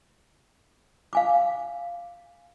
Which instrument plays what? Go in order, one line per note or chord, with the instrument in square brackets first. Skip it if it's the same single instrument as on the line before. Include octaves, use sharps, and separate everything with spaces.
[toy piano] F5 G#5 D6